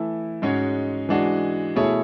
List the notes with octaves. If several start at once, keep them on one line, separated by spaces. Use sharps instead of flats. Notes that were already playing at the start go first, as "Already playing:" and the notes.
Already playing: E3 A3 E4
G#2 G#3 C#4 F#4 C#5
E3 G#3 D4 F#4
B2 A3 E4 G#4 C#5